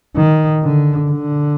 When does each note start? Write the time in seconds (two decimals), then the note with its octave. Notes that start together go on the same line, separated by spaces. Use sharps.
0.16 D#3
0.63 D3
1.11 D3